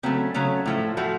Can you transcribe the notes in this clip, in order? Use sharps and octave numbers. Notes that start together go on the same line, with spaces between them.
C#3 F#3 A3 C4
C#3 F#3 A3 C#4
A2 F3 A3
A2 F3 A3 F#4